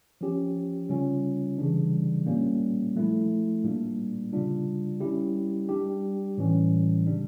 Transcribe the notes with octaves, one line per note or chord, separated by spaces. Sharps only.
F3 C#4 G4
C#3 G3 C#4 F4
C#3 E3 G3 D4
A#2 G3 A#3 C#4
F3 A3 E4
A#2 G3 A#3 D4
C#3 G3 D4 F4
G3 C#4 E4 G4
G3 D4 G4
A2 E3 G3 C#4
C#3 G3 D4